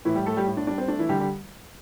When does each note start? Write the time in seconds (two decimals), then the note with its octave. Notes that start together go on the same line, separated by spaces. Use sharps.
0.05 A2 E3 E4
0.15 G3 G4
0.26 A2 A3 A4
0.37 G3 G4
0.46 A2
0.57 D4
0.67 G3 D4
0.78 C4
0.88 A3 D4
0.99 E3 E4
1.09 D3 G3 G4
1.20 G3 G4